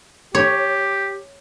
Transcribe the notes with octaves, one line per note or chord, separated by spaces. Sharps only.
G4 C#5